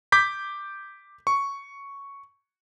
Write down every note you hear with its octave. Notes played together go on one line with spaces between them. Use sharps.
D6 G6 B6
C#6